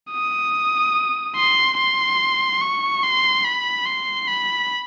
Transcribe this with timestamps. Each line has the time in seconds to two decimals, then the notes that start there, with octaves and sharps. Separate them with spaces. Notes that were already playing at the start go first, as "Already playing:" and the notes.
0.12 D#6
1.36 C6
1.78 C6
2.61 C#6
3.03 C6
3.44 B5
3.86 C6
4.27 B5